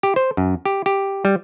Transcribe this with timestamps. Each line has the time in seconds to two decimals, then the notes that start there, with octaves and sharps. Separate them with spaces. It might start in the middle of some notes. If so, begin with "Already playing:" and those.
0.03 G4
0.16 C5
0.37 F#2
0.66 G4
0.86 G4
1.25 G3